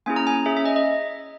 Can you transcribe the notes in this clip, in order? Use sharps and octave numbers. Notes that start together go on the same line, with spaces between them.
A#3 C#4 E4 G#4 G#5
A#5
G#5
C#4 G#4 E5
E5
D#5
D#5